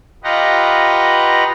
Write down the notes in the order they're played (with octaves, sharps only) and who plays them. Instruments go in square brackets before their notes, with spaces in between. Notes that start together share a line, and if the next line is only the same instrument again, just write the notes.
[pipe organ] F4 G4 B4 D#5 F#5 A#5